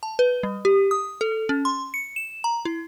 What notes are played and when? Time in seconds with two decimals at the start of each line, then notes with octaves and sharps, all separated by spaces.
0.03 A5
0.19 B4
0.43 G3
0.65 G4
0.91 D#6
1.21 A4
1.49 C#4
1.65 C6
1.94 C#7
2.16 E7
2.44 A#5
2.65 E4